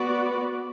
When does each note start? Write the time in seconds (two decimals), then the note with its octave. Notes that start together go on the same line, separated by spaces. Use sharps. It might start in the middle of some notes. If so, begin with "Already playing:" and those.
Already playing: B3 F#4 B4 D5